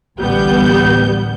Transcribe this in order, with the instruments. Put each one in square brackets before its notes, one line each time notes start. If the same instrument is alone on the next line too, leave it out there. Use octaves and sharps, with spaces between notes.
[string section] A1 D2 G3 B3 G6